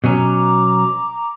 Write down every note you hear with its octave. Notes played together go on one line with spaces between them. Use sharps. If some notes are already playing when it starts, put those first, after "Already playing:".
B2 F#3 C#4 A#5 D6